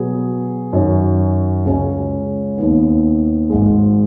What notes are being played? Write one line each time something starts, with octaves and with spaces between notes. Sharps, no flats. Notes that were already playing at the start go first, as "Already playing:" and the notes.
Already playing: B2 F#3 B3 G#4
F#2 D#3 F#3 C#4
C#2 C#3 G#3 C#4
D#2 D#3 B3
G#1 G#2 G#3